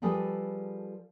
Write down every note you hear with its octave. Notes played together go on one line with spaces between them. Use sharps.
F3 G3 G#4 A4 B4